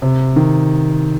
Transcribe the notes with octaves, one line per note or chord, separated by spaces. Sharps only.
C3
D#3